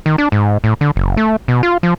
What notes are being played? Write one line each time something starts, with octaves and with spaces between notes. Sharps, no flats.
D#3
D4
G#2
A2
D3
F#1
A3
B2
F4
F3